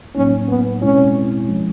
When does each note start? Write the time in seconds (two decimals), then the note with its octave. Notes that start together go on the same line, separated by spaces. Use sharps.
0.15 A2 F#3 A#3 C#4 D#4
0.48 B3
0.82 B2 G#3 C4 C#4 E4
1.48 F3 G#3 C#4